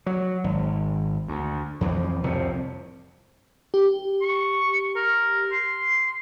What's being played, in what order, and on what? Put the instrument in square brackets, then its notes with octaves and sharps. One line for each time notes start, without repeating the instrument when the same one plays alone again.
[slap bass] F#3
G#1
D2
F2 E3 F3
C2 F2 A2 C3
[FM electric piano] G4
[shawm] C#6
A#4
C6